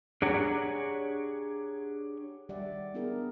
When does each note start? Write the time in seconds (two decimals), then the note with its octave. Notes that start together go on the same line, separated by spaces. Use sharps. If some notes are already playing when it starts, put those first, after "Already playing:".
0.22 D4 G4 G#4 C#5 F#5 A#5
2.49 D#3 G3 G4 D5 E5 F#5
2.94 B3 D4 E4 G4 G#4 A#4